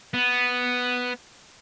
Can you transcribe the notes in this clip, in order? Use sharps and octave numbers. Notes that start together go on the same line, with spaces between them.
B3